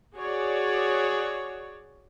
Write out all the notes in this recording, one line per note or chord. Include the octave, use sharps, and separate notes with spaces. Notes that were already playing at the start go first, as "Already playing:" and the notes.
F#4 G#4 C#5 D5